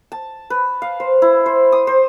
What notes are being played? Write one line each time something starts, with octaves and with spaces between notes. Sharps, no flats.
A5
B4
F5
C5
E4
C5
D#6
C5